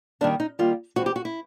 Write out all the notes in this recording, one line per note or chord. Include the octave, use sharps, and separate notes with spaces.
D#3 G3 A#3 D4
D#4
D#3 G3 A#3 F4
E3 G#3 C4 F#4
G4
F#4
E4